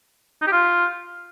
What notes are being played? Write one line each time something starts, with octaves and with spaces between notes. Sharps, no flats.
D#4
G4
F4